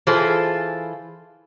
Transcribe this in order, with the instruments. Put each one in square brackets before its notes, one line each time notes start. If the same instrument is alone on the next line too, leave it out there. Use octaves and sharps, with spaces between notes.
[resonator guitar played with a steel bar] E3 F4 G#4 A4 C5